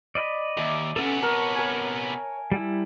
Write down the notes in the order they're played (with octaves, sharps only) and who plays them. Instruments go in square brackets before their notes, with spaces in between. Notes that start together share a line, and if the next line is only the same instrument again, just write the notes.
[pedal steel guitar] D5 D#5 B5
[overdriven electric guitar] D#2 [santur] E5 D6
[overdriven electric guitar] C3 B3 [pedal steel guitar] C#4 A4
[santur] A#4 A5 [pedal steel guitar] C#5
[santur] A#4 G#5
[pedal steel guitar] G3 E4